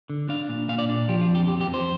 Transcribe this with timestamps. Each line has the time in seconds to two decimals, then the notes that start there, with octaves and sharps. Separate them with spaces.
0.10 D3
0.29 D4 F5
0.49 A#2
0.69 A#2 F5
0.78 D5
0.89 D4
1.09 F3 G4
1.21 F4
1.28 F2
1.35 G4
1.47 F2 G4
1.61 G4
1.67 F2
1.74 C5